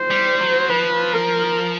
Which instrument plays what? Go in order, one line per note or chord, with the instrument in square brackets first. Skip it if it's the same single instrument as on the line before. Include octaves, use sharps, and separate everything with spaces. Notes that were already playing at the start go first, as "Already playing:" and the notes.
Already playing: [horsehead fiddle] C5
[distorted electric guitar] G3
F#3
[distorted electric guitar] F3 [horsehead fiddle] B4
[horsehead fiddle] A#4